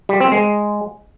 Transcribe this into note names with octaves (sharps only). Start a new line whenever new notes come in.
G3
C4
G#3